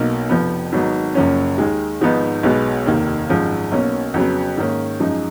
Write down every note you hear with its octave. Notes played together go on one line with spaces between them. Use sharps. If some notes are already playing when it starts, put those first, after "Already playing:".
Already playing: B1 B2 A#3 D#4
F1 F2 F3 B3
G#1 G#2 F#3 B3 D#4
F#1 F#2 F3 A#3 C#4
D#2 D#3 G#3
G#1 G#2 F3 B3 D#4
B1 B2 G#3 B3
F1 D#2 D#3 A#3
G#1 F#2 F3 G#3
B1 B2 A#3 C#4
F2 C#3 F#3 B3
G#2 D#3 A#3 C#4
F#2 F3 G#3 D#4